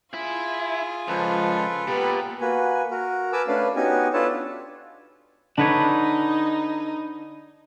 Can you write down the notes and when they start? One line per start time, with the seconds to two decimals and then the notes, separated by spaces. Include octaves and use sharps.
0.14 E4 F4 G#4
1.08 C#2 F3 A4 B4
1.88 A#2 B3 G4
2.41 A#3 F#4 B4 G#5
2.91 F#4 A#4
3.32 A#4 B4 G#5 A5 D6 E6
3.48 A3 C#4 D4 B4 F5
3.76 B3 C#4 D#4 F#4 G4 G#5
4.13 D4 F4 A4 B4 C#5 A5
5.58 D3 D4 D#4 B4 C#5